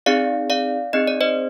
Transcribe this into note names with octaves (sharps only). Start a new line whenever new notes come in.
C4 D#4 G#4 D5 F5
D5 F5
C4 D#4 G#4 D#5
D5
C5 D#5